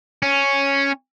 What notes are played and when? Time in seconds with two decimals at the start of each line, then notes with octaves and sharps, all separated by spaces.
0.22 C#4